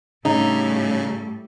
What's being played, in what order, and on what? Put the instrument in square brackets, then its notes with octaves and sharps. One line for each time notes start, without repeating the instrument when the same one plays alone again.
[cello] A2 G3 [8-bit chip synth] C#3 [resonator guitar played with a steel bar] D#4